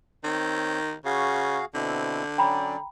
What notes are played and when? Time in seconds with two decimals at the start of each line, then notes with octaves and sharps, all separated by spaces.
0.24 D#3 C4 C#5 G6
1.05 C#3 F#4 G#4 F5
1.74 B2 D3 C4 E4
2.38 F#3 C#4 D5 G5 A#5 B5